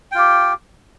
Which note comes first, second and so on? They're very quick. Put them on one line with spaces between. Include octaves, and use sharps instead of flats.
G5 F4 G4